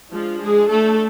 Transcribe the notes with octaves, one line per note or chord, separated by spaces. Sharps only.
F3 G#3 D4 F4
G#3 G#4
A3 A4